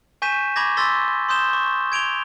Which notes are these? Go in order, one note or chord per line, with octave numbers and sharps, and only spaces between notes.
G#5 C#6 G6 B6 D#7 E7
B5 C#6 D6 G#6 A#6
C6 E6 A6 B6 G7
C6 D#6 G6 E7 G7
C#6
G#6 D7 F7 G7